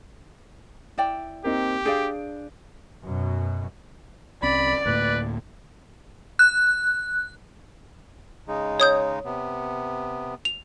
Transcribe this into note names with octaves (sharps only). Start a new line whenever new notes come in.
E4 D5 G5
A#3 C4 D#4 G4
D4 G#4 D5 F5 G6 D7
F#2 B2
C2 C4 C#4 D5 B5
D2 A2 A#3 B4
F#6
C#3 G#3 D#4
C#5 D#6 G6
C3 B3
F7